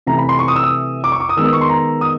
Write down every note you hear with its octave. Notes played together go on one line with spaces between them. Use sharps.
C3 E3 A3 A#5
B5
C6
C#6
D#6
E6
D#6
D6
C#6
D6
D#6
D#3 G#3 B3 E6
D#6
C#6
C6
A#5
D#6